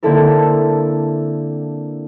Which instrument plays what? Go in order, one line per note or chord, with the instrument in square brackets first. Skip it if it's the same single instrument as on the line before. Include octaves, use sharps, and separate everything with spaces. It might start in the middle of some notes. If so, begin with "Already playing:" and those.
[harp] D3 A#3 C4 E4 A4 A#4